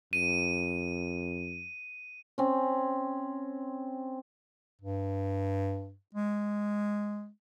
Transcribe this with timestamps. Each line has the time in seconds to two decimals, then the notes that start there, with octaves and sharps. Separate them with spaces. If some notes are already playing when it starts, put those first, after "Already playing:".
0.13 F2 D#7
2.38 C4 C#4
4.81 G2
6.14 G#3